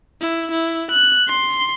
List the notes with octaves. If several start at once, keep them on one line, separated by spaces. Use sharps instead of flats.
E4
E4
F#6
C6